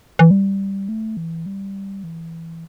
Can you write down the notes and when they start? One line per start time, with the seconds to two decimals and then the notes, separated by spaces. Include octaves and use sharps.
0.19 E3
0.31 G3
0.89 A3
1.17 E3
1.46 G3
2.04 E3